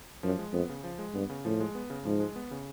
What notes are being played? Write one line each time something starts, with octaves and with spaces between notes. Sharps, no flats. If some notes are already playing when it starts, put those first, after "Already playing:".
F#2 F3
G#3
F2 B3
C#3
F3
G#3
G2 B3
C#3
A2 F3
G#3
B3
C#3
G#2 F3
G#3
B3
C#3